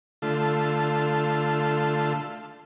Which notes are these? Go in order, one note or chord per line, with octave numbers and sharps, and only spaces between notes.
D3 A3 F4 A4